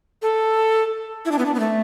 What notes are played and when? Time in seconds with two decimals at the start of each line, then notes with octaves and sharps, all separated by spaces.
0.22 A4
1.25 E4
1.32 D4
1.39 B3
1.46 D4
1.54 B3
1.60 A3